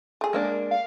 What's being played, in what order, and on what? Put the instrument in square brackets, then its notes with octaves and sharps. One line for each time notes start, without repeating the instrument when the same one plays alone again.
[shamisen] A3 G#4
[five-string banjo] G#3 A#3 D4
[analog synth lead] F5